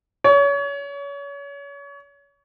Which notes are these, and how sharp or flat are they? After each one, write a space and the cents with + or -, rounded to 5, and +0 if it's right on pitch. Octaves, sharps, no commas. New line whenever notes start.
C#5 +30